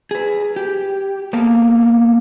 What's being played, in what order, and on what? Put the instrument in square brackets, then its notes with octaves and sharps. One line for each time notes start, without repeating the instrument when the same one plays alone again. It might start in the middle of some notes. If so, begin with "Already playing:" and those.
[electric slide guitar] G#4 B4
G4
A#3 B3 A4 F5